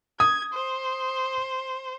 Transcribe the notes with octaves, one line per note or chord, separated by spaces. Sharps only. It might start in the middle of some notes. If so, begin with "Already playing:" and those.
D#6 G#6
C5